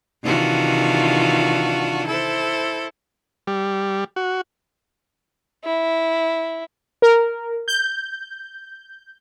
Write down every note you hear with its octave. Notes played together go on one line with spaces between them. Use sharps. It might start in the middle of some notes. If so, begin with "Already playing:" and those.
C3 D#3 E3 D4 F4 F#4
E4 A4 C5
G3
F#4
E4
A#4
G6